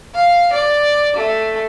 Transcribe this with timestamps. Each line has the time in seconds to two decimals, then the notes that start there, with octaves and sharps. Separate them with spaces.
0.15 F5
0.53 D5
1.16 A3